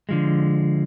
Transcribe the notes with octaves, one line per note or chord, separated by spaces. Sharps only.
D3 F3 G#3